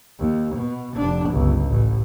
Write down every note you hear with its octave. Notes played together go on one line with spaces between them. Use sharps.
D#2
B2
F1 D4
G1 C#2
A1